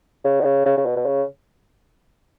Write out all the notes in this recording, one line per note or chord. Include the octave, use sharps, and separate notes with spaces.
C#3
D3
C#3
C#3
C#3
B2
B2
C#3